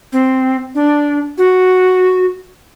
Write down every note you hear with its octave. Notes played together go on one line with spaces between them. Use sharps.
C4
D4
F#4